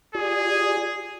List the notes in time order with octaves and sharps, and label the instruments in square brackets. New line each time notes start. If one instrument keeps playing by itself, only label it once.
[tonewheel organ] F4 G4 D5 [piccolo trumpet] G#4